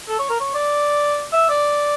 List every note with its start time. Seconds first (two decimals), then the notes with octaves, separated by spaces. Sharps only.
0.08 A4
0.19 C#5
0.30 A#4
0.40 C#5
0.55 D5
1.33 E5
1.50 D5